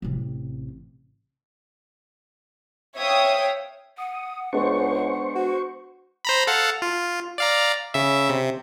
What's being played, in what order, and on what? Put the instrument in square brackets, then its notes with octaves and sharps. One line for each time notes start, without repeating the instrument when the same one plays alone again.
[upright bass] A1 C3
[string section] C#5 E5 F5 G5 D#6
[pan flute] F#5 [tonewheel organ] D#6
[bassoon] C#2 [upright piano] G#3 B3 D4 [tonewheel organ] C5 C#6
[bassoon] F#4
[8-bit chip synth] C5 A#5 B5
A4 F5 F#5
F4
D5 F5 A#5
C#3 E5
C3